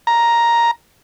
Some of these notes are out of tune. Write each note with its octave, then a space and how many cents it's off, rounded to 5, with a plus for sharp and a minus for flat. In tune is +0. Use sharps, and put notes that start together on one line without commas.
A#5 +5